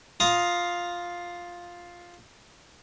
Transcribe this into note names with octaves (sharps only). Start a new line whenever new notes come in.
F4 F5 A#5 D#6